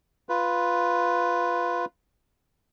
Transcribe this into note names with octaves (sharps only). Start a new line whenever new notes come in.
F4 B4